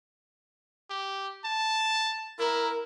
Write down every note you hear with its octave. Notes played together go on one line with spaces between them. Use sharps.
G4
A5
E4 A#4